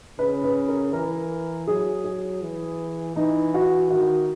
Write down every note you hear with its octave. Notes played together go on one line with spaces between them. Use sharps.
C#3 B4
B4
A#4
E3 A#4
F#3 G#4
G#4
E3
E3 D#4
F#4
D#3 F#4